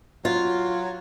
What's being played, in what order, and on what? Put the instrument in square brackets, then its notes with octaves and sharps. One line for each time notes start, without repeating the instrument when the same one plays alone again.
[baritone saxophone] F#3 [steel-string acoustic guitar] F4